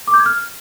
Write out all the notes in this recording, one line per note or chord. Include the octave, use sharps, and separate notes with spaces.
D6
G6
G#6
F6